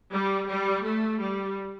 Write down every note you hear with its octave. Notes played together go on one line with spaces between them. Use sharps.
G3
G3
A3
G3